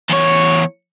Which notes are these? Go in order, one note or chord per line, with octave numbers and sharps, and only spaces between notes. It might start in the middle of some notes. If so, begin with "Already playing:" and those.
E2 C#5